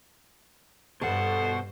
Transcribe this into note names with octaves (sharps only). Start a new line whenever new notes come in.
G2 B2 A4 C5 F#5 A5